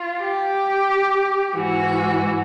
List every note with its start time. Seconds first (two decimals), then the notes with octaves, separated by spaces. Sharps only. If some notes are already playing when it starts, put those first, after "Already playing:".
Already playing: F4
0.20 G4
1.55 G#2 E3 F#4